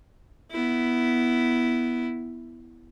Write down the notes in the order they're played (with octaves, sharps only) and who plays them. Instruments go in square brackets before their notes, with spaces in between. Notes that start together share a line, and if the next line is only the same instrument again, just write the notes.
[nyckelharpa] B3 E4